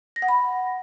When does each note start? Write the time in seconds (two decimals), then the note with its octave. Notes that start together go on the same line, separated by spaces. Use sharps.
0.16 A#6
0.22 F#5
0.28 B5